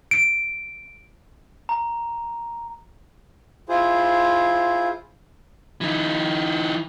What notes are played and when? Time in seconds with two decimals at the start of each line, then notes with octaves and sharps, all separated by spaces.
0.11 D7
1.69 A#5
3.69 E4 F4 G#4 C5
5.81 E3 D#4